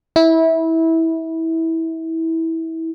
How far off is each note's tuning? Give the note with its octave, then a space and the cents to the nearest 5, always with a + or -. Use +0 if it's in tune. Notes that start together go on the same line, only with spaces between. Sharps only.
E4 -20